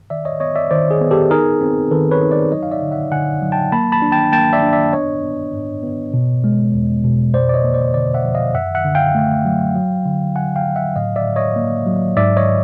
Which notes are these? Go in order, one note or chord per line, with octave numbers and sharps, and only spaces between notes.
D#3 D5 E5
C#5 D#5
B3 C#5 D#5
D5 E5
D#3 C5 D5
G#4
B3
G4 A4
D#4 G#4 A#4
C4
D#3 A4 B4
B4 C#5
D#4
C5 D5
F#3 C#5 D#5
F5
D5 E5
D3
E5 F#5
D3 F#5 G#5
F#3
G5 A5
A#3 A5 B5
A5 B5
D4
G5 A5
A#3 G5 A5
D5 E5
D4
D5 E5
B3 C#5 D#5
B3
G#2
B3
B2
G#3
E2
B2
F2 C5 D5
D5
C#5 D#5
A#3
C5 D5
D3 C5 D5
E5 F#5
F3
D#5 F5
F#2 E5 F#5
E5 F#5
D3
F5 G5
A3
F#3
F#3
D3
D3 F#5 G#5
F5 G5
F#3
E5 F#5
A2 D#5 F5
D5 E5
A2
C#5 D#5
A#3
F#3
G#2 D5 E5
C#5 D#5